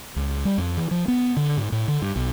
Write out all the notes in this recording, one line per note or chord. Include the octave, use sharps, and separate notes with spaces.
C#2
G3
F2
E3
F3
B3
D3
G#2
A2
D3
G2
B1